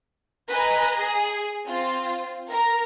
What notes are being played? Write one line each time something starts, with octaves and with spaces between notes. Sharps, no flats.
B4 D#5 G#5 A#5
G#4
C4 F4
A#4 A#5